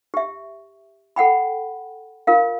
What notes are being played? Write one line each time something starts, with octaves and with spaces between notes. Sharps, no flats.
G4 E5
A4 F#5 G5 B5
F4 A#4 F5